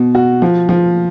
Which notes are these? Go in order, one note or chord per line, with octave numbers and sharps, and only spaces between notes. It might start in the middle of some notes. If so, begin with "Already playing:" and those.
Already playing: B2
F#4
F3
F3